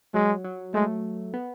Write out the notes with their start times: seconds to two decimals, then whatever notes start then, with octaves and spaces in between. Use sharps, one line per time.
0.14 F#3 G#3
0.45 F#3
0.74 G#3 A3
1.34 B3